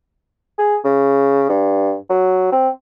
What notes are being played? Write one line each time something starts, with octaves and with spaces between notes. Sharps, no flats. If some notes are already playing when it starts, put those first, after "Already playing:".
G#4
C#3
G2
F#3
C4